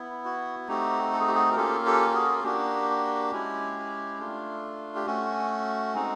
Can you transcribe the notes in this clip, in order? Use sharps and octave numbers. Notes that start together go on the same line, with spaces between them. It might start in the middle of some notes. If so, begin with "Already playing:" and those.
Already playing: B3 E4
F#4
A3 C4 D#4 F#4 G4
A4
G#4
G4
F#4 G#4
A#4
A#3 C#4 F4 G4 A4
G4 A4
F#4 G#4
A#3 D4 F#4 G4
G#3 C#4 E4
A3 D4 F4
G4
A3 C#4 F#4
G#3 C4 D#4